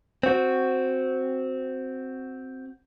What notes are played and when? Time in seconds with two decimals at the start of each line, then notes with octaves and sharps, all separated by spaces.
0.23 C4 F#4